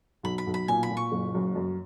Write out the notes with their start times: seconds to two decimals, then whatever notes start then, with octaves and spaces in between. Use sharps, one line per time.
0.23 B1 B5
0.38 B5
0.47 B1
0.54 B5
0.68 A#2 G#5
0.83 B5
0.91 A#2
0.97 C#6
1.12 F#1
1.35 F#2
1.55 F#2